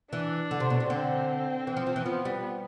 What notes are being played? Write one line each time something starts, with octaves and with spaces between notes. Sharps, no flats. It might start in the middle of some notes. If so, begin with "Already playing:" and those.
E3 D4
D3
C3
B2
C3
D3 C4
E3
F3
F3
E3
F3 B3
G3